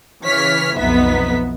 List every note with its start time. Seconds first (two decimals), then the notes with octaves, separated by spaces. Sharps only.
0.24 C#3 E3 C#5 F6 B6
0.76 B1 F2 B3 D#4 E5 B6